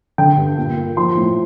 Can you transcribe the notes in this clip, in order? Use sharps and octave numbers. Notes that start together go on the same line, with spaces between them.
D3 G5
G2
A#2
A#3
F3 C6
A2